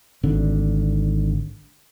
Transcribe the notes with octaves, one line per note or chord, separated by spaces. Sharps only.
G#1 D3